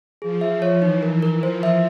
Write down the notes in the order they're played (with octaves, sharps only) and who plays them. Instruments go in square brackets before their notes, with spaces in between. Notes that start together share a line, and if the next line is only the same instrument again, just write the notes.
[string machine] F3 [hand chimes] G#4
[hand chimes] E5
C#5
[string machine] E3 [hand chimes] D#4
[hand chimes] A#4
A#4
[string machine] F3 [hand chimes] C5
[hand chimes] E5